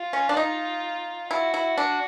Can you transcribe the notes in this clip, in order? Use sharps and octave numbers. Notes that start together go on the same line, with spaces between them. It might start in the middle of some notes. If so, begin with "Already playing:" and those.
Already playing: F4
C#4
D4
D#4
E4 F#4
E4
D4